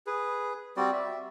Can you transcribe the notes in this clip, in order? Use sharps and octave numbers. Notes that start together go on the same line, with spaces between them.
G#4 B4
G3 C4 F#4 D5
E5